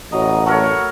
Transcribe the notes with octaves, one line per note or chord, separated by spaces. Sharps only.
A1 F#3 D#5 A#5
A3 F#4 A#4 C#5 B5